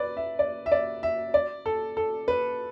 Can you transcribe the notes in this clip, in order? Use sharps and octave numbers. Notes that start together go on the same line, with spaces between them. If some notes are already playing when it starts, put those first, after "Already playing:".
Already playing: B4 D5
E5
D5
E5
D5
E5
D5
A4
A4
B4